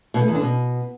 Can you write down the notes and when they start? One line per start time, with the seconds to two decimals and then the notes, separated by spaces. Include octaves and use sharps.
0.14 B2
0.21 A3
0.28 E2
0.35 D3
0.42 B2